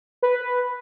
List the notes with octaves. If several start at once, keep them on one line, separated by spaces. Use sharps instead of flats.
B4